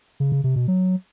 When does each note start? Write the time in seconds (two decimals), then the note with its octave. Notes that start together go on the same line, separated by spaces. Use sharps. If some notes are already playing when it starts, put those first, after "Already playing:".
0.20 C#3
0.32 C#3
0.44 C3
0.56 B2
0.68 F#3